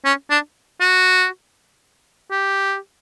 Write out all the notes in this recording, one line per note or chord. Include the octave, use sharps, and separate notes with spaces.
C#4
D4
F#4
G4